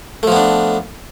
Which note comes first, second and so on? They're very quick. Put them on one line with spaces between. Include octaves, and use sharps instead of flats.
A3 F3 B3 D4